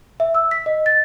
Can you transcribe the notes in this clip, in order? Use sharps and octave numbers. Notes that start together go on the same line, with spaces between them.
E5
E6
B6
D#5
A6